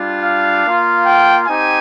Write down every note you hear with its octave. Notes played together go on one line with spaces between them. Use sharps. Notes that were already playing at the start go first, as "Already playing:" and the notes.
Already playing: G3 D4 F4
F5
A#3 F4
G5
C4 D#4 G4 G#5